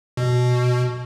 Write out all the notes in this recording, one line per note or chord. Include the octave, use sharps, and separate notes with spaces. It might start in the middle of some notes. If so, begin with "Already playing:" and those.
B2